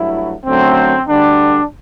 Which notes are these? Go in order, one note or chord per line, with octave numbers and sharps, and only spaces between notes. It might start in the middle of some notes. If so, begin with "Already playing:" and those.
Already playing: G2 F#3 A3 E4
F#2 D3 F#3 A3 C4
D2 D3 G3 D4